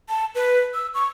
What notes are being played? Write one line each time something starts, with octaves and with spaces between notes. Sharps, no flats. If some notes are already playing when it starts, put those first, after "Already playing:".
A5
B4
E6
C#6